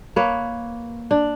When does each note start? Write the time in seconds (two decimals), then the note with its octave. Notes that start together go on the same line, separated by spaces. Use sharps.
0.16 A#3 B4 C#5
1.11 D4